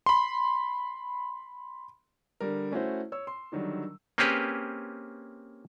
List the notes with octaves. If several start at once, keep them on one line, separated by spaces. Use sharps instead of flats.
B5 C6
D3 G3 A#4
A3 C#4 E4 F#4 C5
C#5 E6
C6
D3 D#3 F#3 G3
A#3 C4 C#4 G4 G#4 B4